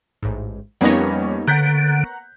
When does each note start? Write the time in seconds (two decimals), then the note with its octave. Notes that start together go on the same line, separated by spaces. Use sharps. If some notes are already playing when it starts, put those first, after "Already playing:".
0.23 A1 G#2
0.81 F2 G3 A#3 B3 C#4 D#4 C#5 A#6
1.48 D3 F#5 A#5 F#6 G6 B6